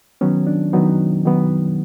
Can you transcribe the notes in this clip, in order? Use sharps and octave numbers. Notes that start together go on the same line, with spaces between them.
D#3 F#3 B3 C#4
D4
D#3 F#3 B3 D#4
D#3 F#3 B3